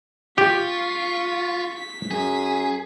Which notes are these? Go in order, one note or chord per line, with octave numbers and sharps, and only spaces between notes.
F4 G4 C#6 B6
B6
F#2 G#4